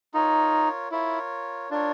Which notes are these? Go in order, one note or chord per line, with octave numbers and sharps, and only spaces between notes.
D#4 F4 A#4 C#5
E4 F4 A#4 C#5
D4 F4 A#4 C#5